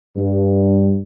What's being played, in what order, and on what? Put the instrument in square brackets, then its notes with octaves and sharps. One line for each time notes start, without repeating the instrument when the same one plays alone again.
[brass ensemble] G2